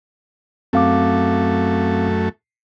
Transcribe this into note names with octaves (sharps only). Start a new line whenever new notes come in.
F#2 A3 C4 F5 D6